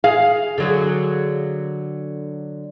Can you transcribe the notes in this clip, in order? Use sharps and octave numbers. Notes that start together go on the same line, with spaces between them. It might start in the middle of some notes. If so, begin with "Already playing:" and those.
G#4 F5
D3 F#3 G#4